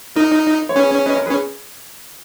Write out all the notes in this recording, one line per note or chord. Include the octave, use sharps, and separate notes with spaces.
D#4 A#4
C#5
C#4 G#4 B4
B4 D#5
A#4 C#5
G#4 B4
C#4